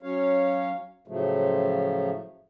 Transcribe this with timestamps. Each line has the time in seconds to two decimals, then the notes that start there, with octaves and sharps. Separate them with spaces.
0.02 F#3 C#4 C#5 F5
1.08 A2 C#3 F3 F#3 A3